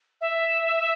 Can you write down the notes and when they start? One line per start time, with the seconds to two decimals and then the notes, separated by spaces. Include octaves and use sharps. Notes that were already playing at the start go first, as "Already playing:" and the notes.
0.21 E5